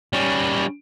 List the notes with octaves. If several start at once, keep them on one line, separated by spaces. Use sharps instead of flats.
G3 C#4